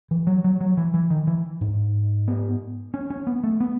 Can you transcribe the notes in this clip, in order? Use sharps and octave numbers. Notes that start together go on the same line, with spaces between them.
E3
F#3
F#3
F#3
E3
E3
D#3
E3
G#2
B3
C#4
C#4
B3
A3
B3